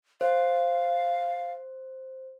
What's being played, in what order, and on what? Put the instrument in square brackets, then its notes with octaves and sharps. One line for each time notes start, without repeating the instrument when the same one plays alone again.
[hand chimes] C5 [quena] F5